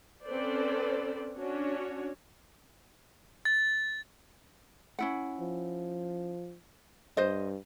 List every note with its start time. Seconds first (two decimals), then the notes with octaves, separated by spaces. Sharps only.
0.25 C4 C#4 A4 B4 C5 D5
1.38 C#4 D4 F#4 C#5
3.45 A6
4.99 C#4 E4 F#5
5.40 F3
7.17 G2 C5 D#5